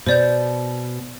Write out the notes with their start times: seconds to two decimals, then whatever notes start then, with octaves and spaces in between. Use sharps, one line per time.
0.06 B2 C5 D5 G6